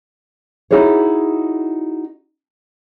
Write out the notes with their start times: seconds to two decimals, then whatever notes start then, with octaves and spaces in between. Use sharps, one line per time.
0.71 D#4 E4 F#4 G#4 C#5